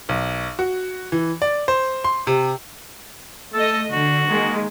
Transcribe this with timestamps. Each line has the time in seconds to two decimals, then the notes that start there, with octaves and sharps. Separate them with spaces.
0.09 B1
0.59 F#4
1.12 E3
1.42 D5
1.68 C5
2.04 C6
2.27 C3
3.54 A3 A4 D#5
3.91 D3 F#4
4.28 D#3 G#3 A#3